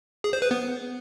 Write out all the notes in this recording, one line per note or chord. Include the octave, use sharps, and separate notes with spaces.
G#4
C5
B4
B3